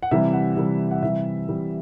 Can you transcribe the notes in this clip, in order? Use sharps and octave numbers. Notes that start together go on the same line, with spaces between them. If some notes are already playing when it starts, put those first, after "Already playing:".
F#5
C3 E3 G3 E5
F#5
C3 E3 G3
F#5
C3 E3 G3 E5
C3 E3 G3